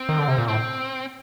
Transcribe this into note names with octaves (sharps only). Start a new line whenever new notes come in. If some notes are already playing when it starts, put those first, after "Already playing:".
Already playing: C4
D#3
D3
C3
A#2
A2 C4